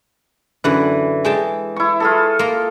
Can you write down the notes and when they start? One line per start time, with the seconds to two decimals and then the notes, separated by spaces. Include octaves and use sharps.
0.64 F#2 D3 E3 F#5
1.25 G#3 G5 A5
1.76 E4 C#6
2.00 F4 G#4 A4
2.39 A#3 A#5 C6